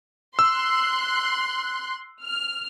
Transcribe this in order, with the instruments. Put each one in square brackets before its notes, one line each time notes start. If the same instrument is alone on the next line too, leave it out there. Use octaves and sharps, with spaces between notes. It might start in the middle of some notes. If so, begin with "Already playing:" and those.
[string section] C6 F#6 [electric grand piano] E6
[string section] F6